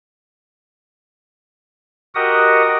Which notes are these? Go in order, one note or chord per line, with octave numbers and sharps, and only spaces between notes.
F#4 G4 A#4 D#5 F#5 D#6